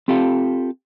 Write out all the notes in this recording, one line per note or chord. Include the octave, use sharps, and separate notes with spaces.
C4 F4 G4 A4 F5